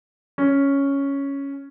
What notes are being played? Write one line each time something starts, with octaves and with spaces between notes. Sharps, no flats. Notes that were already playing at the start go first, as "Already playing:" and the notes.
C#4